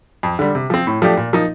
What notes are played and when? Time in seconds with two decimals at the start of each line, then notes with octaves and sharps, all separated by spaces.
0.23 F2
0.39 D3 G3
0.55 C3
0.70 F3 C4
0.87 A2
1.02 F3 A3 D4 G4
1.17 A#2
1.33 F3 A#3 D#4